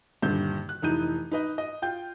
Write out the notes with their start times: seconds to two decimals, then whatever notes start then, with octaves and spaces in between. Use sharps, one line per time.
0.22 D#1 G2 D3 G6
0.69 F#6
0.82 F1 E3 D#4 G6 D#7
1.32 D#4 B4 D#5
1.58 D#5
1.82 F4 G5 G6